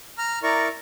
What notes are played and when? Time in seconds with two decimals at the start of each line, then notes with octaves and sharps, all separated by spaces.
0.18 A#5 F6
0.43 E4 A#4 D5 A#5 C#6